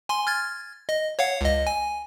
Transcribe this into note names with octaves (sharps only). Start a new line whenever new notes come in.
G#5 C6
F6 G#6 A6
D#5
C#5 F5 F#5
C#2 D#5
G#5